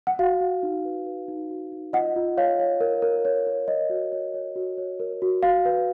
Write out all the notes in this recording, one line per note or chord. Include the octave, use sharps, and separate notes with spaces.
F#5
F#4 F5
F#4
D#4
B4
B4
D#4
F#4
D#4
F4 D#5 F#5
F4
C#5 F5
C#5
A#4
A#4
C#5
A#4
C#5 D#5
F#4
C#5
C#5
F#4
C#5
A#4
F#4
F#4 F5
B4